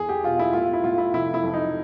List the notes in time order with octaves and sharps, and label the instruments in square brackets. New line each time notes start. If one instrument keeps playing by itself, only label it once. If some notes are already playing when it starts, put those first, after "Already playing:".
Already playing: [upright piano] E2 G#4
G4
B2 F4
E4
A2 F4
E4
A2 F4
E4
F1 E4
E4
F2
D#4